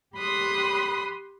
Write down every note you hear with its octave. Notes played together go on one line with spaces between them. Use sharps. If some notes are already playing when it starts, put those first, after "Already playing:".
G4 B5 C6 D#6 F#6